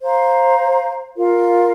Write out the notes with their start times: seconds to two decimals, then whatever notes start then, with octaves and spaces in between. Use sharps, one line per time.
0.02 C5 F5 A#5
1.15 F4 A#4 F5